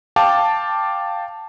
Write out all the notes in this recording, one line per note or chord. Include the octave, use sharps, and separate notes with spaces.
F5 G5 A5 D6